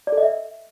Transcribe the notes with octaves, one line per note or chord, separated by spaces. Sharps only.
D5
A4
D#5
E5